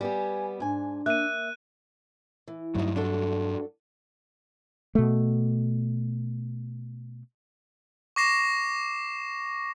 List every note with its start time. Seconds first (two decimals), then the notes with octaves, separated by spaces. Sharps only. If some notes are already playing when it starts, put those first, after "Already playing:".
0.01 G3 B3 G4 G#5
0.60 G#2 D4 G#5
1.06 A#3 E5 F#6 D#7
2.48 E3
2.75 D2 G2 F#3 D#4
2.96 D4 F#4 A4
4.95 B2 A3
8.16 C#6 D6 A#6 C7 E7